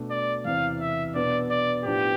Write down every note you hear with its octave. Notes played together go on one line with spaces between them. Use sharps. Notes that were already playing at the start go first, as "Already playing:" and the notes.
Already playing: B2 A3 D4
D5
E2 C3 E3 F5
E5
B2 B3 D4 D5
D5
A2 F3 B3 D4 G4